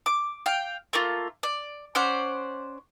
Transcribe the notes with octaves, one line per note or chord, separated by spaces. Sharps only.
D6
F5 G5
A3 A#3 F4
D5
C#4 C5 D5 F#5